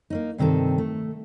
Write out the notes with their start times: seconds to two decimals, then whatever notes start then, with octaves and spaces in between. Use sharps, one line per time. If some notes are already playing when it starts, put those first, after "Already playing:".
0.10 A#3 C#4 D#4
0.38 G2 C3 D#3 C4 A4
0.78 A3